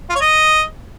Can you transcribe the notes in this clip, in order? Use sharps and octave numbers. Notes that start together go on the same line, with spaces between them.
F4
C#5
D#5